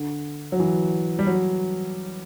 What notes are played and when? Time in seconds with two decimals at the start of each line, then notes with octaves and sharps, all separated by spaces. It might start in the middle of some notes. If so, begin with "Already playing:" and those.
Already playing: D3
0.52 F#3
0.60 E3
1.19 G3
1.27 F#3